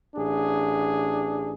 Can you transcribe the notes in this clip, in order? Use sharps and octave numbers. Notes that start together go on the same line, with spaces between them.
A1 D4 G#4